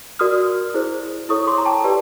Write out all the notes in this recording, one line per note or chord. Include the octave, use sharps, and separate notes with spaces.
F#4 A#4 D5 D#6 F6
E4 G#4 C5
E4 A4 C#5 C#6 D#6
C6 D6
A#5
G5 A5
G4 B4 D5